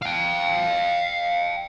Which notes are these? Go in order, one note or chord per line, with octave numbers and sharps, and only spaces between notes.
F5 G5